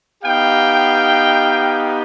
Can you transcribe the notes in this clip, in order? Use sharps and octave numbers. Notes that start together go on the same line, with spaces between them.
B3 D#4 G4 F5 G5